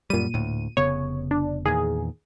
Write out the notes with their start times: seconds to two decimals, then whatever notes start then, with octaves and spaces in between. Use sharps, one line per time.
0.10 F#2 A#2 G3 D#7
0.34 D2 A2
0.77 F1 C#3 B3 C#5
1.31 D4
1.66 E2 A#2 D#3 G#4